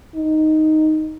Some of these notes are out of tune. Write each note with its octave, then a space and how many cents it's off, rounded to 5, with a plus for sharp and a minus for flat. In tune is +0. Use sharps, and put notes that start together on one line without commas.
D#4 +0